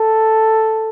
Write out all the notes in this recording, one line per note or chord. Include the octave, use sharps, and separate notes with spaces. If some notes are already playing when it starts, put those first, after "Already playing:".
Already playing: A4